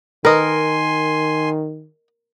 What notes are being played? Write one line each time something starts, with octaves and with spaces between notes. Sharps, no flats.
D#3 A#4 B4 D#5 G#5 C6